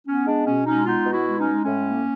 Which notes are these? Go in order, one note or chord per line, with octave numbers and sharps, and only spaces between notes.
B3 C#4
G#3 D4
B2 C#4
G#3 C#4 D#4
B3 D#4 F4
B2
E4 F#4
G#3
C#4 D#4
G#3
A2 C#4
A#3